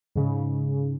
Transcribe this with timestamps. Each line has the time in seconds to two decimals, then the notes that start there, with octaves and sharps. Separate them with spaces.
0.15 G#2 C#3